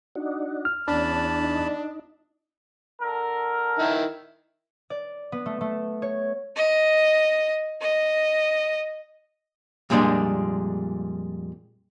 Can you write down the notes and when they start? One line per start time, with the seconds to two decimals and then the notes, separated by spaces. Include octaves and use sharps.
0.15 D4 D#4 F#4
0.65 F6
0.88 E2 C#4 D4 A5 B5
1.44 D#4
3.00 D3 A4 A#4
3.79 D#3 E4
4.90 D5
5.32 B3
5.46 A3
5.61 A3
6.02 C#5
6.57 D#5
7.82 D#5
9.90 F2 A#2 G3 G#3 D4